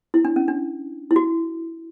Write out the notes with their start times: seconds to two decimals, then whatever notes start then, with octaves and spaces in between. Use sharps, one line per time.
0.14 E4
0.25 D4
0.36 C#4
0.48 D4
1.11 E4
1.16 F#4